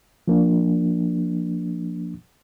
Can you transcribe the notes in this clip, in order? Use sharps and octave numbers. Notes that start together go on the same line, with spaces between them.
F3 A#3 D4